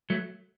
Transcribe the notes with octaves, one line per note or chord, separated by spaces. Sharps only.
F#3 A3